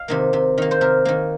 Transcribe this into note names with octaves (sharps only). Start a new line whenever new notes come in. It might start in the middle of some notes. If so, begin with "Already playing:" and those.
Already playing: D#5 F5
C3 D#3 A#3
C3
D#3 A#3
C5
C3 A#4
D#3 A#3